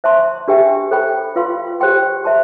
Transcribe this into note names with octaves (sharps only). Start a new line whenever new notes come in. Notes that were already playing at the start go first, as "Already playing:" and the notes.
C5 E5 A5 C6
D4 G4 B4 E5 G5
A4 C5 G5 B5
F4 B4 F5 C6
G4 C5 G5 C6
C5 E5 A5 C6